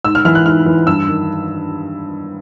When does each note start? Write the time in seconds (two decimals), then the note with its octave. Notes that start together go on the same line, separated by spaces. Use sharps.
0.05 G#2 E6
0.15 F6
0.25 E3 F6
0.35 F#6
0.46 G#2 F6
0.66 E3
0.87 G2 E6
1.08 D#3